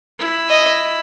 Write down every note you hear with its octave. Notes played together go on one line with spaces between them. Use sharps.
E4
D#5